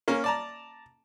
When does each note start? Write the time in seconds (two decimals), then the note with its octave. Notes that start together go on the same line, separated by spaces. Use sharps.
0.08 A#3 C#4
0.24 D5 A5 A#5